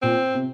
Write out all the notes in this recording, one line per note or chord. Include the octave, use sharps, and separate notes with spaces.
A#2 C4
C3